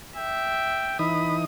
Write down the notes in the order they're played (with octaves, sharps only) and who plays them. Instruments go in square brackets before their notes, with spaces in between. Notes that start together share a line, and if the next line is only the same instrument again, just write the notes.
[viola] E5 [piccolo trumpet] G5
[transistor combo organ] E3 D#4 D#6 [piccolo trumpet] B5